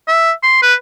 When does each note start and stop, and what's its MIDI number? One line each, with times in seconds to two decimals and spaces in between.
0.08 0.32 76
0.43 0.62 84
0.62 0.75 71